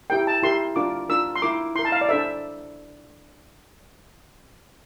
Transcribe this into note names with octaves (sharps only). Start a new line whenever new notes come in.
E4 G4 A#4 G5
A5
E4 G4 A#4 C6
D4 F4 A#4 D6
D4 F4 A#4 E6
C6
E4 A#4 D6
E4 A#4 C6
A5
F5
D5
D4 A4 C5 E5